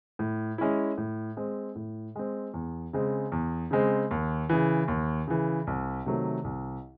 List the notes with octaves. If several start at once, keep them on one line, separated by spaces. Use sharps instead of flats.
A2
G#3 C#4 E4
A2
G#3 C4
A2
G#3 C4
E2
C#3 G#3 C4
E2
C#3 G#3 C4
D#2
C#3 E3
D#2
C#3 E3
C2
C3 D#3 F#3 A3
C2